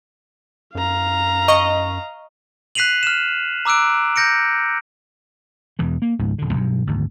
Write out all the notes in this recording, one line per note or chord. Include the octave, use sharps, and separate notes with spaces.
F#2 F5 A#5
D#5 C#6
F#6 B6 C7 D#7 F7 F#7
F6 E7
A#5 D6 E6 F#6 D7
G6 A#6 C#7 D7
E1 E2 E3
A#3
G#1 C#2 G#2 F3
D#1 D3
B1 G2
G#1 D2